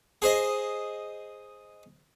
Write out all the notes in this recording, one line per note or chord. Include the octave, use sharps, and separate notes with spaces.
G#4 C5 D#5